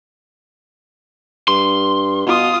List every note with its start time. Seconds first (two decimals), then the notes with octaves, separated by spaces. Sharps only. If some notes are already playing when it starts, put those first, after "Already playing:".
1.48 G2 C6
2.27 B2 F4 D#6